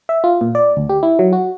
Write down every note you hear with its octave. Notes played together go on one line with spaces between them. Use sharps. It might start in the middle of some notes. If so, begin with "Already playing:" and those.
E5
F4
A#2
D5
D2
G4
E4
F#3
F#4